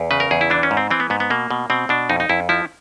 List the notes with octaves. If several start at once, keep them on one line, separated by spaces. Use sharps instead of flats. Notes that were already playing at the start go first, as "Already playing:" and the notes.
Already playing: E2
C#3 B4
A#4
E2 G#4
E4
E3 D4
C#4
G#2
C4
E3 C4
B3
G#2 B3
B3
B2 A#3
B2
B2 C4
B2 D4
F2 D#4
D#4
F2 E4
F3 E4